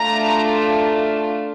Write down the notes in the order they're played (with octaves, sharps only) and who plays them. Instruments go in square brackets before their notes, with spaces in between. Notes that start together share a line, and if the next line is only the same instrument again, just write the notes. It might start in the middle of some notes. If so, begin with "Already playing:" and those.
Already playing: [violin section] A3 D4 F4 A#5